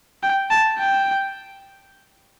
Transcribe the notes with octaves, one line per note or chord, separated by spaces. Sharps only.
G5
A5
G5